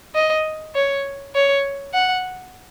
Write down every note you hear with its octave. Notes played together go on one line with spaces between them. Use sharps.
D#5
C#5
C#5
F#5